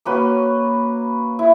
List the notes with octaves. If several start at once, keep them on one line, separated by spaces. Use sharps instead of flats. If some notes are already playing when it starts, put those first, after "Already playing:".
A#3 C#4 F#4 B4
E4